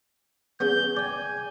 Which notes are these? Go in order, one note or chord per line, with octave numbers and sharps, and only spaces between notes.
B3 C#4 G#4 G6
D5 G5 G#5